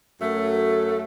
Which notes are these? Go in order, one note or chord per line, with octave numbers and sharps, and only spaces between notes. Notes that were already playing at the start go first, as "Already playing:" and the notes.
F#2 F#3 A3